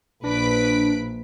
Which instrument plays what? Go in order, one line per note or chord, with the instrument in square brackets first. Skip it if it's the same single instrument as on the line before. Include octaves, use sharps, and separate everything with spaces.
[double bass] A#1 [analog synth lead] D4 [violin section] B4 B6 D7